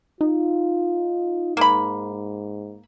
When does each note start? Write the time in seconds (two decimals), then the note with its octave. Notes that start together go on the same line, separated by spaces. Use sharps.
0.21 D#4 F4
1.57 G#2 A#3 B5